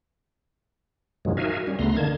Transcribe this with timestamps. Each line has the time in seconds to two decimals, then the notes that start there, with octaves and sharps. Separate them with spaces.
1.25 G2 B2 D#3 F3 F#3 G#3
1.37 D#4 F#4 A#4 E5 F5 G#5
1.67 G3 C#4
1.79 D2 C#3 A3 B3 A#5 C6
1.97 D3 D#3 A#3 A5 G#6